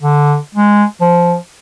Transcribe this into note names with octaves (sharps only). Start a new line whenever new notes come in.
D3
G#3
F3